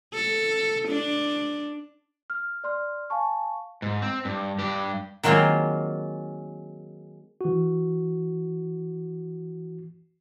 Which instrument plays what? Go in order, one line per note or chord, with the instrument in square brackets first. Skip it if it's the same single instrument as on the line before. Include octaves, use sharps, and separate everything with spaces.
[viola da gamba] A4
D4
[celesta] F6
D5 C6 F6
F5 G#5 A5 C#6
[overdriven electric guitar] G#2
C4
G2
G2 G4
[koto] D#3 F#3 G#3 A#3 C4 F4
[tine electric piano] E3 F#4